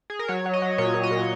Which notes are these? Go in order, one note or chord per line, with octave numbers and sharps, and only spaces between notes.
G#4
A#4
F#3 C#5
F#3
D#5
F#3
A#2 C#5
A#2
D#5
A#2